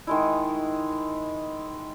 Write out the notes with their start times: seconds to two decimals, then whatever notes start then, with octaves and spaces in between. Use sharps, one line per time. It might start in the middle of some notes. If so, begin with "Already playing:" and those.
0.07 D#3 G#3 E4